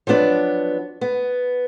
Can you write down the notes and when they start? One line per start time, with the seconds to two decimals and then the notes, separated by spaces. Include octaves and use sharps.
0.07 F3 F#3 B3 D4
1.01 B3